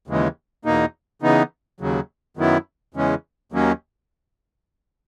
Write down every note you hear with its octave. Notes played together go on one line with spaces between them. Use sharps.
D#2 C#3 E3 G#3
E2 B2 A#3 D#4
C#3 E3 B3 D#4
D#2 C#3 F#3
F#2 D#3 F#3 B3 E4
E2 C#3 E3 G#3 C#4
D#2 D#3 F#3 A#3 C#4